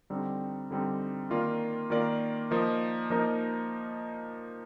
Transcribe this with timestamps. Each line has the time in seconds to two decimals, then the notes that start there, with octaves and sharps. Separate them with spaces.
0.10 D3 G3 C4 D#4
0.71 D3 G3 C4 D#4
1.30 D#3 A#3 F4 A#4 D5
1.90 D#3 A#3 F4 A#4 D5
2.51 F3 A#3 D#4 A#4 D#5
3.10 F3 A#3 D#4 A#4 D#5